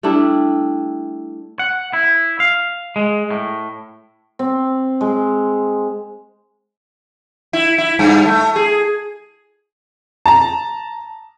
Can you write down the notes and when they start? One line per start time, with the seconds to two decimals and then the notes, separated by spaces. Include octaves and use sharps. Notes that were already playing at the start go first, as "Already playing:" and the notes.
0.03 G3 A3 D4 E4
1.59 F#5
1.93 E4
2.40 F5
2.96 G#3
3.31 A2
4.39 C4
5.01 G#3
7.53 E4
7.78 E4
7.99 G2
8.26 A3
8.56 G#4
10.26 A5 A#5